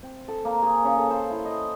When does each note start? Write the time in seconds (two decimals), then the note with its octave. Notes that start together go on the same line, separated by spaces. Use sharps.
0.03 C4
0.28 A4
0.45 A#3
0.62 G#4
0.85 C#3
0.98 A4
1.11 C5
1.30 E4
1.45 D#5